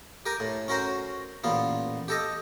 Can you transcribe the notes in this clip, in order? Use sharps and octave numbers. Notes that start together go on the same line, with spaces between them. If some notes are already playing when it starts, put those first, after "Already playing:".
G4 A#4 G#5
A2
C#4 F#4 A#4 C5
A1 A#2 B3 F4
G4 A4 D#5